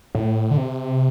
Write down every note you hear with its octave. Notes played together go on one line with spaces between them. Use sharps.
A2
D3
C3